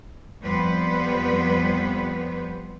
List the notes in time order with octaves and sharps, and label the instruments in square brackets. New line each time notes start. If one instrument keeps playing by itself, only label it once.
[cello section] F2 G3 B3 B4 C5